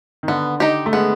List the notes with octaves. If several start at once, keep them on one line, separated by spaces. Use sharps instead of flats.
D#3
D3 B3
D#4 G4
A3
G#3 B3